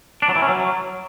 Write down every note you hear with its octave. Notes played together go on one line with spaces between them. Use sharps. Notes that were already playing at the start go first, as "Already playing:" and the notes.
D4
F#3
E3
C#4
F#3